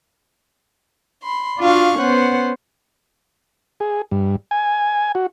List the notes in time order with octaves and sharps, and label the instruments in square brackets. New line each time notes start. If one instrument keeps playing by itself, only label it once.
[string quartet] B5 C6
D4 F4 F#4 F5 C#6
B3 C#4 C5 F#5
[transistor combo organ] G#4
G2
G#5
F#4